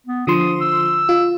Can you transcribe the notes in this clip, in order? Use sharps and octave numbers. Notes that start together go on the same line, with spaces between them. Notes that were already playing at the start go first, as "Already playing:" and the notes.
B3
D3 F3 C6 D#6
E6
F4